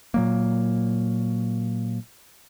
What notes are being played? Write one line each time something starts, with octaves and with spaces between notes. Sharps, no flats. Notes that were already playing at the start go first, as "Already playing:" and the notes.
A#2 F#3 A#3